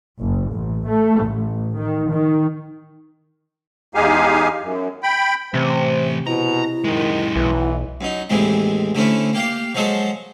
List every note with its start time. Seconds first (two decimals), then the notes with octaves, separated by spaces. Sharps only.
0.21 F#1
0.52 A1
0.88 A3
1.23 A1
1.77 D#3
2.10 D#3
3.95 E2 G#3 D#4 G4 F5 G#5
4.62 F#2
5.03 G5 B5
5.54 C3 E3 A3 C5
6.27 B2 E4 A#5
6.84 F#2 D#3 G#3
7.36 B1 E3
8.01 F#2 D#4
8.30 D#2 A2 E3 G#3 C4
8.95 D3 A3 C4 C#4 E4
9.33 A#3 G4 F5
9.75 F3 F#3 G#3 A4 C5